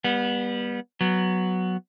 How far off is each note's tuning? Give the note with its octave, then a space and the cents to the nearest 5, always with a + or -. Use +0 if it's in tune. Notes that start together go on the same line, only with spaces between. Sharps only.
G3 +20 B3 -25
F#3 +0 B3 +0